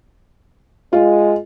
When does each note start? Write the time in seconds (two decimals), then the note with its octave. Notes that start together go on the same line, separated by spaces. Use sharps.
0.93 G#3 F4